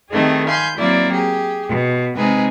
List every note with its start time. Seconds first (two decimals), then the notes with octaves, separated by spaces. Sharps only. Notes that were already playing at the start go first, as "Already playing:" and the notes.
0.11 D#3 G3 A3 C4 D#4 G#4
0.47 F5 G#5 B5 C6 G6
0.77 F#3 A#3 C4 E4 D5
1.12 G4 G#4
1.69 B2
2.16 C3 G#3 C4 D#4 G#4 B4